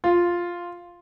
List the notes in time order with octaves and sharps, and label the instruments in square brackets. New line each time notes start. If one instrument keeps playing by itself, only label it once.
[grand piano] F4